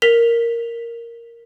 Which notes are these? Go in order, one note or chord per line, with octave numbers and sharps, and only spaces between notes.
A#4 B6 F7 G7